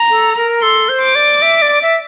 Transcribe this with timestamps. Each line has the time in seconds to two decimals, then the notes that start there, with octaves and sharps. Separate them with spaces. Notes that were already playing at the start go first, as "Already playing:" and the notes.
Already playing: A#5
0.10 A4
0.36 A#4
0.62 A4 C6
0.89 C5
1.02 D6
1.15 D5
1.42 E5
1.62 D5
1.82 E5